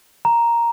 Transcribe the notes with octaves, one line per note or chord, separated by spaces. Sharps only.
A#5